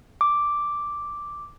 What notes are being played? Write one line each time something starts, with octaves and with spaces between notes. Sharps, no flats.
D6